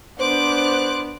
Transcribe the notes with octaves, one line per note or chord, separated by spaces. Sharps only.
B3 D4 C5 D6 F#6